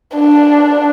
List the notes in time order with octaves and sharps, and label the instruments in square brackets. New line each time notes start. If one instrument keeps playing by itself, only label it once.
[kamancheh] D4